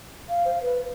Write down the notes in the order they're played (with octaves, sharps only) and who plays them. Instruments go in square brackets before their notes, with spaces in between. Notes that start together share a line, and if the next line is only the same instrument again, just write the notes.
[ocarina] F5
[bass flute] C5
B4